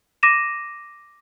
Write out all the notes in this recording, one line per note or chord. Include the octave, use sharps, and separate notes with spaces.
D6 A#6 D#7 E7